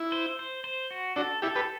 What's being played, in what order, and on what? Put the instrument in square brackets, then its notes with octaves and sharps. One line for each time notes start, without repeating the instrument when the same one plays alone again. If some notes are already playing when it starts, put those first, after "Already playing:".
Already playing: [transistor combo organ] E4
[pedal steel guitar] C5
C5
C5
F#4
[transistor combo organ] D4 F#4 [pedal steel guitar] A4
[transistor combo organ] E4 G4 [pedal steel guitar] A4
[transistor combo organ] G4 B4